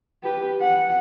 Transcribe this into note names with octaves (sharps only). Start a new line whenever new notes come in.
G4 B4
F#5